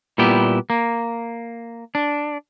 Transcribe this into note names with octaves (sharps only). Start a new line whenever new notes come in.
A#2 G3 B3 E4 G4
A#3
D4